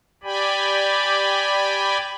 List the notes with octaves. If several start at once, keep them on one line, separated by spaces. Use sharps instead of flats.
G4 D5 G5 G#5 B5